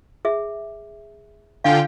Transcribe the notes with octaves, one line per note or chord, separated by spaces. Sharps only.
G#4 E5
D3 F4 F5 G5 G#5